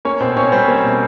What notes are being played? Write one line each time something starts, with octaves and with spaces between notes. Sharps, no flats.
A#3 C#4 C#5
B2 C4 C5
B2 C#4 C#5
G3 C4 C5
A#3
B2